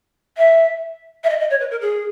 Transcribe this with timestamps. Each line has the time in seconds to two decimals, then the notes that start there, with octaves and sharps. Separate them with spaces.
0.37 E5
1.24 E5
1.29 D#5
1.40 D#5
1.50 C#5
1.60 B4
1.71 A#4
1.81 G#4